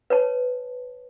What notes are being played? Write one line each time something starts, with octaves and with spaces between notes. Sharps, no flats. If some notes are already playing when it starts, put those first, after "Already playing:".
B4 C#5 A5